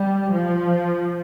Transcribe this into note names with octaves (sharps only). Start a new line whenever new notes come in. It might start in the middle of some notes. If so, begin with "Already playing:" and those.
Already playing: G3
F3